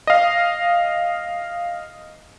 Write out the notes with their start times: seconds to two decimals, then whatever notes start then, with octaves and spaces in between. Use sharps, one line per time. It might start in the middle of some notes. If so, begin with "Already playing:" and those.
0.07 D#5 F5